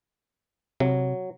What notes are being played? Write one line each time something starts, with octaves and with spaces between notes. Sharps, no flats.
C3 F#3